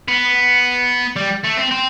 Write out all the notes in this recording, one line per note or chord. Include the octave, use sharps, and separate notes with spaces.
B3
G3
A3
C4
C4